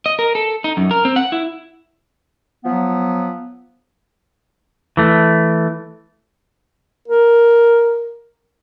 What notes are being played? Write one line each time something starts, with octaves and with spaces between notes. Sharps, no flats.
D#5
A#4
A4
D#4
F#2
A#4
C4
F#5
E4
F3 F#3 B3
E3 A3
A#4